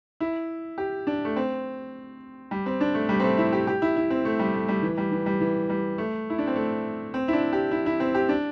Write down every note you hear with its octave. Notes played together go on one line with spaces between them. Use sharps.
E4
G4
D4
A3
C4
G3
C4
D4
A3
G3
C4
A3
E4
G4
G4
E4
E4
C4
A3
G3
A3
G3
E3
G3
E3
G3
E3
G3
A3
E4
D4
C4
A3
C4
E4
D4
G4
E4
E4
C4
G4
D4